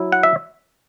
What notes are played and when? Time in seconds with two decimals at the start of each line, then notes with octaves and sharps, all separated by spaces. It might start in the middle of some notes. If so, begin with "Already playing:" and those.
Already playing: F#3 E4
0.12 F#5
0.23 E5